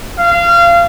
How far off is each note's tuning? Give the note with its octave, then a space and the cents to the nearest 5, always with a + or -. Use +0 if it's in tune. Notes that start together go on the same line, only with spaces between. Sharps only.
F5 -25